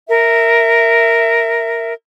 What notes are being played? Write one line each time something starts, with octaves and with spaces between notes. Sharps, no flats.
A#4 E5